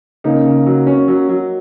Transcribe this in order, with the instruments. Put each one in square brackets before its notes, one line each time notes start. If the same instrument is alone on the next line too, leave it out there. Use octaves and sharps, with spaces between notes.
[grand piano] C#3 [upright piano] A#3 D#4
[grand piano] C#3
F#3
C#4
F#3
F#3